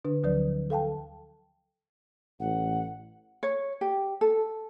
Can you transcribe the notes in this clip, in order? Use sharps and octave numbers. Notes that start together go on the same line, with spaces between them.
D3 D4 B4
D2 D3 F3 F#3 B4 D5
A4 F5 G5 A5
A1 F#5
C#5
G4
A4